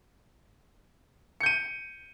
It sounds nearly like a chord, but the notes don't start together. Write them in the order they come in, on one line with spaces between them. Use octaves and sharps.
C#7 G6 D#7